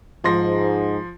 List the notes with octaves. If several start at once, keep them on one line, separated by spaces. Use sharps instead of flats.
G#2 F3 C6 A#6